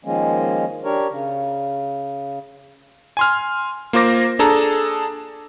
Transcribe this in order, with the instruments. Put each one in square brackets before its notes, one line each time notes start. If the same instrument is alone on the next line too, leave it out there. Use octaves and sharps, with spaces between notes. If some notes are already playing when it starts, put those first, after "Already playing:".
[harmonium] D#3 F3 G#3 A#3 C#4
D4 G4 A#4 C#5
C#3
[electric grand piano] G#5 C6 F6
A#3 F4 C5 D6 A#6
D4 G#4 A4 A5 A#5